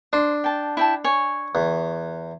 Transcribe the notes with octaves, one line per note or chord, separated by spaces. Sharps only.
D4 C5
G5 A5
E4 G5 A5
C#5 G#5
E2